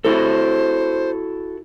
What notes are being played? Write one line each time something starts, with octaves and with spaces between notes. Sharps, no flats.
E4 F#4 A4 C5